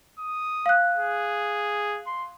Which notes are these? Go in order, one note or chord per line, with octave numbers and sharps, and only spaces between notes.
D#6
F5 F#6
G#4
C6